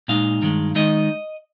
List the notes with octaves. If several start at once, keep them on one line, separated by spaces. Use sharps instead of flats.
A#2 G#3 D#4 F5
G2 D#3 G#3
D#3 G#3 D#4 D#5